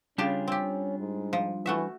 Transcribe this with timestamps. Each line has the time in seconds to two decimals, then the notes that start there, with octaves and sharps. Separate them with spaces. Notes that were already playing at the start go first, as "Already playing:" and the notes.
0.18 C#3 G3 C#4 D4 F4 G4 A5
0.48 C4 G4
0.99 G#2
1.33 F3
1.66 E3 A3 F#4 E5